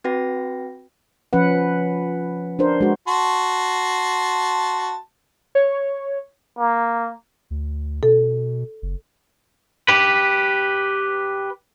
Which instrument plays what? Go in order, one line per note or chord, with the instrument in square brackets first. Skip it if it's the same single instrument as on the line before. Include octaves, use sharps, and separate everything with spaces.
[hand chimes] C4 F#4 B4 G5 A#6
[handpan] F3 C#4 B4 F#5
D4 A#4 C5
G#3 F#4
[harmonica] F#4 A5 C6
[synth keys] C#5
[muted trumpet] A#3
[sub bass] D2
[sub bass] B2 [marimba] A4
[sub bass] F#1
[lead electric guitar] G4 B4